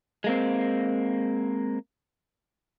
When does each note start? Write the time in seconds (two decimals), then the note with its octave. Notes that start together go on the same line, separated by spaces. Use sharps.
0.24 G#3 A#3 C4